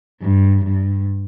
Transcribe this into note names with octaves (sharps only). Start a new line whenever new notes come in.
G2
G2